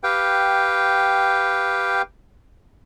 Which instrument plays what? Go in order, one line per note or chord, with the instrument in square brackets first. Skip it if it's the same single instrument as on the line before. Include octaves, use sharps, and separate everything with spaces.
[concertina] G4 B4 F5 G5